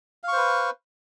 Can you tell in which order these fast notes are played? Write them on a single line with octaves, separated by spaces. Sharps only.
F5 C#6 C5 B4